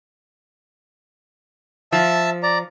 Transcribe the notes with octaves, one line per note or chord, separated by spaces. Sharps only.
F3 E5 A5 E6
D5 A#5